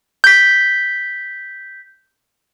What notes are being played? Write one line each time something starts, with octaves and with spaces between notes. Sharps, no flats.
G6 B6